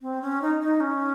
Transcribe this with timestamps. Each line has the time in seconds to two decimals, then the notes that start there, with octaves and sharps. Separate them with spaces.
0.02 C4
0.22 C#4
0.42 D#4
0.61 D#4
0.80 C#4